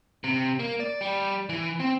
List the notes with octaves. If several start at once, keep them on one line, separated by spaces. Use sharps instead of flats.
C3
A#3
D5
G3
E3
C4